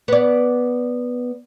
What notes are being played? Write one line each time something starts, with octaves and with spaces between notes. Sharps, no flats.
B3 D5